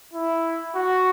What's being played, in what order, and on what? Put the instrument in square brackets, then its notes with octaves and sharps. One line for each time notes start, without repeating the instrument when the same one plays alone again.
[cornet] E4
F#4